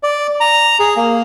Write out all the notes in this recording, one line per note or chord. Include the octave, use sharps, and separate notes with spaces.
D5
A#5
G#4
A#3